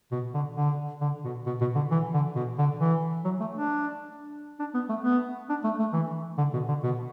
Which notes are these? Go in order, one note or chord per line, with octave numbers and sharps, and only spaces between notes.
B2
D3
D3
D3
B2
B2
B2
D3
E3
D3
B2
D3
E3
F#3
A3
D4
D4
B3
A3
B3
D4
A3
A3
E3
D3
B2
D3
B2